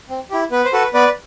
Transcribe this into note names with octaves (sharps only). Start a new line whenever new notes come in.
C4
E4 G4
B3 B4
C5
F#4 A4 B4
B3 B4 D5